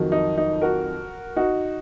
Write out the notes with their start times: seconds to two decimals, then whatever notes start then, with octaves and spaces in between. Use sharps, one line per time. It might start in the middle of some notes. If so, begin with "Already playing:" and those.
Already playing: F2 D#3 F#3
0.12 D#4
0.38 D#4
0.62 F#4 A#4
1.36 D#4 F#4